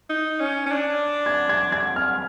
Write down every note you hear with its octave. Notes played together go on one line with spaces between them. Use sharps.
D#4
C#4
C#4
D4
G#6
G#6
G#6
F6